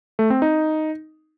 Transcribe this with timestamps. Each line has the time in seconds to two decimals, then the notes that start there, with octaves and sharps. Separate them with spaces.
0.19 A3
0.30 C4
0.42 D#4